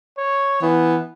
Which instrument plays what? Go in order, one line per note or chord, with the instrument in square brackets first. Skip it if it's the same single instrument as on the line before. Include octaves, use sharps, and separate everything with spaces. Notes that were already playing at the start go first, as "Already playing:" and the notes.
[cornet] C#5
[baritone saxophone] E3 [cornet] B3